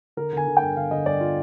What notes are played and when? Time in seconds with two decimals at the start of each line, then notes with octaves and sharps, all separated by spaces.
0.17 D3 A#4
0.33 D3 G#5
0.47 D3
0.57 G5
0.62 G2
0.77 D3 F5
0.91 D3 D#5
1.06 G2 D5
1.21 F4